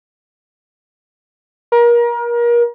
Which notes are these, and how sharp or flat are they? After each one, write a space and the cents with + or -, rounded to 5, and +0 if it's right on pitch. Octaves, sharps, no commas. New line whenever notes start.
A#4 +30